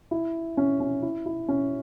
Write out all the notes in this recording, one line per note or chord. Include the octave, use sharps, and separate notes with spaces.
E4
C#4
C#4
E4
E4
C#4